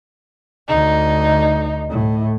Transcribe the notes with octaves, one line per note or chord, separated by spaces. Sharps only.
D2 D#4
A2